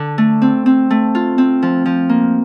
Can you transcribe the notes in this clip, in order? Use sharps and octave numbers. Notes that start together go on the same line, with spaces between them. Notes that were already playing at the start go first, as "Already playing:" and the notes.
Already playing: D3
A3
C4
C4
A3
F4
C4
F3
F3
A#3